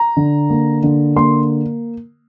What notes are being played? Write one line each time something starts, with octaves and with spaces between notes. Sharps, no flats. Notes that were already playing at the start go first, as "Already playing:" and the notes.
Already playing: A#5
D3
A#3
D3
A#3 C6